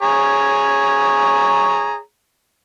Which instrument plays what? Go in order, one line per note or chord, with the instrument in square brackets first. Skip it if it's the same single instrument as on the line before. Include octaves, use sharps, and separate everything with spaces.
[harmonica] G#4 C#5 A#5